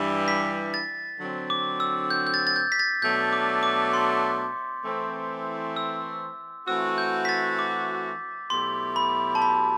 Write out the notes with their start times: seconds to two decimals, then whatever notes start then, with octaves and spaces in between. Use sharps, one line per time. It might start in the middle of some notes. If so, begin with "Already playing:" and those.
Already playing: G2 E3 G3
0.28 B6
0.74 A6
1.19 D3 F#3 C4
1.50 D6
1.80 E6
2.11 G6
2.27 G6
2.34 A6
2.47 A6
2.56 G6
2.72 B6
2.79 A6
3.02 B2 F#3 A3 D4 G6
3.33 D6
3.63 D6
3.93 C6
4.85 E3 A3 C4
5.76 E6
6.67 E3 A3 C4 F#4 E6
6.98 G6
7.25 B6
7.29 A6
7.59 D6
8.50 B2 F#3 A3 E4 G4 C6
8.96 B5
9.35 A5
9.42 B5